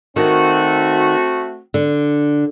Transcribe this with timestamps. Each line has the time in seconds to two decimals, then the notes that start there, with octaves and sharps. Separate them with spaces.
0.16 D#3 A3 C4 F#4
1.74 D3